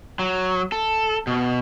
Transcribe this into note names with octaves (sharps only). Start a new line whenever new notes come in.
F#3
A4
B2